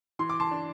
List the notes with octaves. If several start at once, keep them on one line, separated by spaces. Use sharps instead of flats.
E3 C6
D6
A5 C6
D4